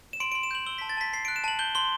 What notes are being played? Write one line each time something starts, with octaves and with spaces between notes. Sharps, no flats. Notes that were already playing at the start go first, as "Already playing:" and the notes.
E7
C6 D7
C6 D7
E7
G6 F#7
E6 G7
A5 B6
A6
A5 B6
A5 C7
F#6 D7
E7
A5 F#7
G6 G7
C6 G7